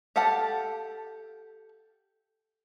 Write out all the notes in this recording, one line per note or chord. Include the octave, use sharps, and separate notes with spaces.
G4 A4 F5 F#5 A5